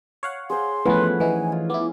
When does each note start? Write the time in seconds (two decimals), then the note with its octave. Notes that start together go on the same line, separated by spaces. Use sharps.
0.23 C#5 F5 F#5
0.50 G#4 C5 C6
0.86 E3 F3 A3 B3 C#4 E4 B4 F#5
1.20 E3 D#4 G#5
1.52 F4
1.70 B3 E4 D6